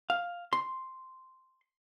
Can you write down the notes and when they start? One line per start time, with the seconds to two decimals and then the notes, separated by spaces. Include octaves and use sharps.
0.10 F5
0.53 C6